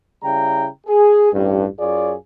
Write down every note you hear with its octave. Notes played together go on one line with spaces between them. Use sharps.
C#3 G3 E4 G5 A#5
G#4
A1 G2
F#2 F4 G#4 C#5 D5